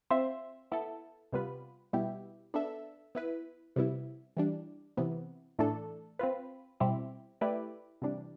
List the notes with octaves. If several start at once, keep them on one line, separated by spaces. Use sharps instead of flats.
C4 F4 C5 E5
B3 E4 A4
C3 G3 B3 F4 B4
B2 G3 B3 E4 G4
B3 D4 A4 E5
B3 E4 B4
C3 G3 B3 E4
E3 G3 D4
C3 E3 B3
A2 E3 A3 D4 A4
C4 F4 B4
B2 G3 C4 E4 G4
A3 E4 G4 B4 D5
C3 E3 G3 D4